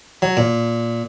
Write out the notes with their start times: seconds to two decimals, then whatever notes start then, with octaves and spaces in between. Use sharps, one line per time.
0.22 F#3
0.37 A#2